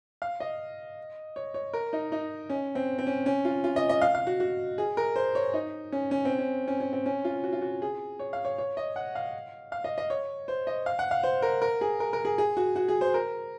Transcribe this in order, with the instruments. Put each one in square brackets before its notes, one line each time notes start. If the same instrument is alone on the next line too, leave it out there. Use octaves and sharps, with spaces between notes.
[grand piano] F5
D#5
C#5
C#5
A#4
D#4
D#4
C#4
C4
C4
C#4
C#4
F4
F4
D#5
D#5
F5
F5
F#4
F#4
G#4
A#4
C5
C#5
D#4
C#4
C#4
C4
C#4
C#4
C#4
C4
C#4
F4
F#4
F4
F#4
G#4
C#5
F5
C#5
C#5
D#5
F#5
F5
F5
D#5
D#5
C#5
C5
D#5
F5
F#5
F5
C5
A#4
A#4
G#4
A#4
A#4
G#4
G#4
F#4
F#4
G#4
C5
A#4